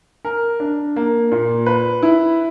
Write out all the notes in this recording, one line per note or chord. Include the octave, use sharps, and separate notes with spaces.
A#4
D4
A#3
A#2
B4
E4